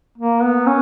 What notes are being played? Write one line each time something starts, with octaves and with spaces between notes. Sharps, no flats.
A#3
B3
C#4